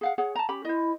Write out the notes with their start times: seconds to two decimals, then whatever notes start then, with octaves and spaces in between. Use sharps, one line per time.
0.01 G#4 F5 F#5
0.18 G#4 C#5 F#5
0.35 A5 A#5
0.49 C#4 G4 B5
0.65 E4 C5 D#5